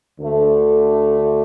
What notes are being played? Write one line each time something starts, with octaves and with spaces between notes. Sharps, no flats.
D2 D3 A3